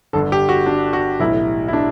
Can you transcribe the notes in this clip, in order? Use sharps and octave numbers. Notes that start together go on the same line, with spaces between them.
G1 G2 D3 A4
G4
F#4
D4
F#4
B1 A2 E3 E4
E4
D4